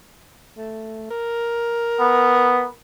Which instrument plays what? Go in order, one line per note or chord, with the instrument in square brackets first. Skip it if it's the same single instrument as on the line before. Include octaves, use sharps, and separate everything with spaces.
[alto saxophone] A3
A#4
[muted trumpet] B3